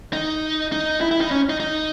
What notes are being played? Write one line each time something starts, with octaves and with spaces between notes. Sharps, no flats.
D#4
D#4
E4
E4
D#4
C#4
D#4
D#4